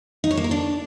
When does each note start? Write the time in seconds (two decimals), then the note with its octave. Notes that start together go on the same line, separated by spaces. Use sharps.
0.24 D#4
0.31 C#5
0.37 A#3
0.44 A#4
0.51 D4